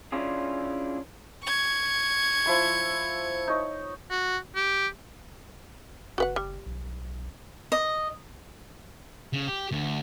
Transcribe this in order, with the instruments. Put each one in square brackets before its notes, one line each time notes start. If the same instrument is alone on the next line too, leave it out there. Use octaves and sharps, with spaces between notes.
[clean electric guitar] C#4 D4 E4 F4 G#4
[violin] C#6 G#6
[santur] F3 E4 C6
D#4 C#5
[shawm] F#4
G4
[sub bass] F#1 [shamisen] F#4 B4 F#5
[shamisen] G3
[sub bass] B1
[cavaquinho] D#5
[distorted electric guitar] C#3
G4
D2